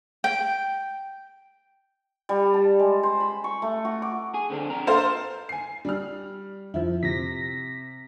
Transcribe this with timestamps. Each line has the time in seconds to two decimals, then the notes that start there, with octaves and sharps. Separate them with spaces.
0.24 G5
2.29 G3
2.54 A5
2.79 G#3
3.03 C5
3.20 B5
3.44 C#6
3.62 A3
3.85 F#4
4.02 D6
4.34 G#4
4.50 D3 C4 D4
4.70 D4 A#4
4.87 A4 C5 F5
5.49 G#5 C7
5.85 G3 F6
6.74 F2 F3 E4
7.03 C3 A#6 B6